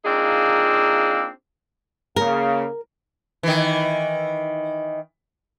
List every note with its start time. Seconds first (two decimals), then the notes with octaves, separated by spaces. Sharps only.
0.05 A#3 C4 D4 D#4 F4 G#4
2.16 C#3 A#3 A#4
3.43 D#3 E3